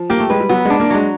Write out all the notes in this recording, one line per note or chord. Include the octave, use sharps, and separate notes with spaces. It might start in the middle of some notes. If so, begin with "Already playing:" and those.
Already playing: F3
A#3 G4
A3
G#3 B4
G3
F#3 B3
G#3 D4
A#3
F#3 G#3